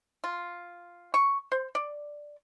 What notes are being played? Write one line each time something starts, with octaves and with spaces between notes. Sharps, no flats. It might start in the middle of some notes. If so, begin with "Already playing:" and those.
F4
C#6
C5
D5